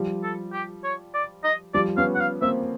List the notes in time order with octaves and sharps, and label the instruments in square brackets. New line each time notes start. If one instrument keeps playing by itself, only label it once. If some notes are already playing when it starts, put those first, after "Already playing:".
Already playing: [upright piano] F3 G3
[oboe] A4
G4
C#5
D5
D#5
[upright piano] F3 G3 [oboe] D5
[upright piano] B3 C#4 [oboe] F5
[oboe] F#5
F5
[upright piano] A#3 C4 [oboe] E5